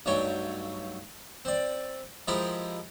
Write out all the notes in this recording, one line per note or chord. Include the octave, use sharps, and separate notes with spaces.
B1 G2 F#3 A3 C#5 G5
C4 D5
F3 G#3 E4 F4 G4 A#4